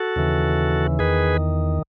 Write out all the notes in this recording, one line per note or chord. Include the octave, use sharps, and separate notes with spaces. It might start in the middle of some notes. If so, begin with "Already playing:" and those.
Already playing: F#4 A4
D#2 C#3 E3
E2 D#3 G#4 B4